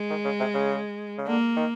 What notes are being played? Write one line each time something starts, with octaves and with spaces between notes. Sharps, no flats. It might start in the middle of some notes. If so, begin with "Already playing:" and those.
Already playing: G#3
D#3
C#3
C3
C#3
C#3
D3 A#3
D#3